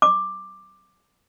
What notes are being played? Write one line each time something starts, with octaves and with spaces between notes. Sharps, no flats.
D6